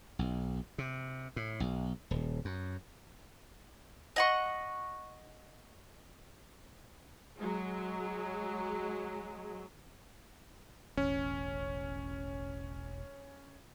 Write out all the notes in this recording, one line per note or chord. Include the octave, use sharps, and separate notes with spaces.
B1
C3
A2
B1
D#1
F#2
D#5 F#5 C#6
F#3 G#3
E1 A1 C#4